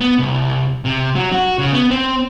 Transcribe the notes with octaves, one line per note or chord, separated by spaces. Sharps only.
B3
C2
C3
F#3
F#4
C#3
B3
C4